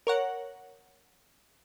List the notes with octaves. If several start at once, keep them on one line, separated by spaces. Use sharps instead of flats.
A#4 C#5 F#5